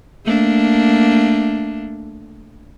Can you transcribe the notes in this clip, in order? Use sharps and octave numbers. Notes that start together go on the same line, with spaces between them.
A3 A#3 D4